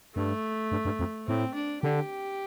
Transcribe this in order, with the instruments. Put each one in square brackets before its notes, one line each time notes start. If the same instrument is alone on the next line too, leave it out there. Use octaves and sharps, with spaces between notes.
[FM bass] G2 [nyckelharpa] A3
[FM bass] G2
G2
F2
[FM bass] A2 [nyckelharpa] C4
[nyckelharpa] D4
[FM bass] D3 [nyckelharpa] G4